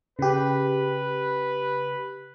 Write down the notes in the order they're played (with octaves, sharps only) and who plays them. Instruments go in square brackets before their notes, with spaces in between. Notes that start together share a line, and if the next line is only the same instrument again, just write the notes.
[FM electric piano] C#3 G4 [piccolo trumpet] B4